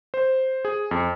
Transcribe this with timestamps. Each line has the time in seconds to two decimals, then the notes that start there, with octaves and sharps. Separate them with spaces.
0.14 C5
0.65 G#4
0.91 F2